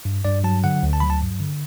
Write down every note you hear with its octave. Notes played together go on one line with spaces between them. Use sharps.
G2
G2 D5
F#3 A5
D3 F#5
D2
A5
F#3 B5
A5
G2
D3